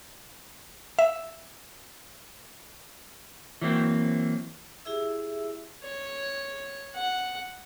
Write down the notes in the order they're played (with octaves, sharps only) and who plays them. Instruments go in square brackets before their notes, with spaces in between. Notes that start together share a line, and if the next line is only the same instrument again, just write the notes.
[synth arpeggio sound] E5
[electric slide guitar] E3 F#3 A#3 C4
[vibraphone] E4 G4 G#4 E5 E6
[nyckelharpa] C#5
F#5